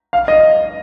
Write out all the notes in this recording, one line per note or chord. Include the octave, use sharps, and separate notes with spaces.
F5
D#5